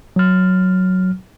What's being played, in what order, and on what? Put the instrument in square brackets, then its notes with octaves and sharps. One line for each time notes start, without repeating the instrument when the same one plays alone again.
[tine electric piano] F#3 F6